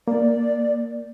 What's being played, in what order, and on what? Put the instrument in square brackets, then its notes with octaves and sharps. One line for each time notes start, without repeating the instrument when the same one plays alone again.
[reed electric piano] A#3 [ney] D5